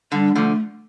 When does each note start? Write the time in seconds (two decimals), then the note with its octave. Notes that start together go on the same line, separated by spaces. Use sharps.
0.12 D3 G3
0.35 D3 F3 A3